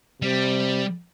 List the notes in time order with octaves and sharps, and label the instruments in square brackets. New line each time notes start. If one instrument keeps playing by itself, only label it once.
[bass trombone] C3 [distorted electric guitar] G3